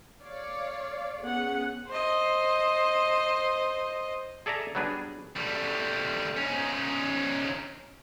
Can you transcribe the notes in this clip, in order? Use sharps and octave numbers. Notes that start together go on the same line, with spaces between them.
C#5 D5 F5
B3 C#4 G#4 F#5
C5 D#5
G#4 A4 D5 E5 A#5
F#3 G3 B3 D4 G#4
G3 A3
C#4 D#4